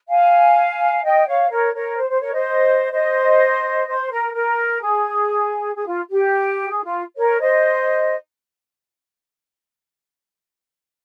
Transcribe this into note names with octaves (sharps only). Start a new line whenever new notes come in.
F5 G#5
D#5 G5
C#5 F5
A#4 C#5
A#4 C#5
C5
C5
A#4 C#5
C5 D#5
C5 D#5
C5
A#4
A#4
G#4
G#4
F4
G4
G#4
F4
A#4 C#5
C5 D#5